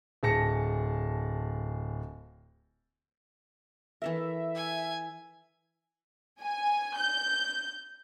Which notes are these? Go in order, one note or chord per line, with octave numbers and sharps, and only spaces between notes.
D1 G#4 A5 A#6 C#7
E3 A4 A#4 E5
G#5
G#5
G6